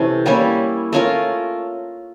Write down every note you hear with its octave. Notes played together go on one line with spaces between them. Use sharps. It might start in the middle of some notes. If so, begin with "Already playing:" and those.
Already playing: C3 E3 A3 C#4
G3 A#3 C#4 E4
A3 C#4 F4 A#4